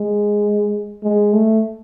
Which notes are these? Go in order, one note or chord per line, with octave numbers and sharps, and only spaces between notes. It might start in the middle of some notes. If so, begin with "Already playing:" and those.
Already playing: G#3
G#3
A3